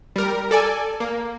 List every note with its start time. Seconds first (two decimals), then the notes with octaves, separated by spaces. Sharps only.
0.16 G3 A#4
0.51 A4 D5 G#5
1.00 A#3